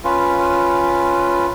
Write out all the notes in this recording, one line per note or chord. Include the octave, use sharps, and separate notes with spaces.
C#4 F4 B4